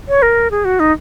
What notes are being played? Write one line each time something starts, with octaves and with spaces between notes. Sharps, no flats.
C#5
A#4
G#4
F#4
D#4